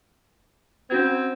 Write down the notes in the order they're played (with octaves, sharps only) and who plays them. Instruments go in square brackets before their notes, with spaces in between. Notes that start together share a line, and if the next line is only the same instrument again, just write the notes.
[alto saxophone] C4 [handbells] C#4 F#4 G#6